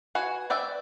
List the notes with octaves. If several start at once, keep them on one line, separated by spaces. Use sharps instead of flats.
F#4 B4 G#5
B4 D5 E5 G5